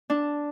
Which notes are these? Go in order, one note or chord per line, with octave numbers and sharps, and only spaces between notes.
D4